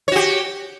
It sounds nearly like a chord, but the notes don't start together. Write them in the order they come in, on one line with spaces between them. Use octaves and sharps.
C#5 F#4 G4